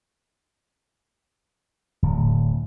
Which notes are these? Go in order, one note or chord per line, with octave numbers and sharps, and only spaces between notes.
D1